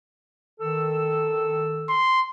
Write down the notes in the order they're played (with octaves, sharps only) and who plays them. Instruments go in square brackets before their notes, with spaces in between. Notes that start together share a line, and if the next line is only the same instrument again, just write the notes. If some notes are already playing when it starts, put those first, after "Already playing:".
[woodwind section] D#3 A4 E6
[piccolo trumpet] C6